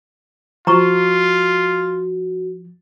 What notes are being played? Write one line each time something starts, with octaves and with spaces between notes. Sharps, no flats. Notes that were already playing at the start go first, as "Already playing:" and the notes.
F3 F4 F#4 A#5 C#6